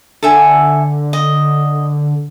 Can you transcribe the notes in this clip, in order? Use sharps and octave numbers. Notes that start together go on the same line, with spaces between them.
D3 A4 E5 G#5
D#5